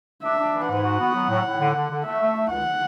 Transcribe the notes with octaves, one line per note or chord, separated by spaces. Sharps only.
D4 E5
D4
E3
G#2 F#5
F#4
B3
F#3
A2
A2
D3
D3
D3
A3 E5
A3
A3
C#2 F#5